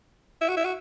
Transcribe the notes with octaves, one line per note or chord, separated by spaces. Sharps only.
E4
F#4
E4
F#4